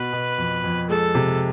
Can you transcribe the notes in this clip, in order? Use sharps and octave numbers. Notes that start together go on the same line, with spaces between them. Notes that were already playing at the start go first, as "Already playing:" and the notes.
Already playing: B2 B3 B4
B2
F2
F2
G#3 A4
C3